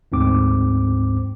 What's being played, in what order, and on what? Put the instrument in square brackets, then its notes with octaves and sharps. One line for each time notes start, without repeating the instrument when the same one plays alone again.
[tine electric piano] D2 G#2 C4 D6